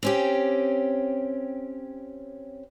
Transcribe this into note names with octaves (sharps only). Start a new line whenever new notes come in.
C4 C#4 G4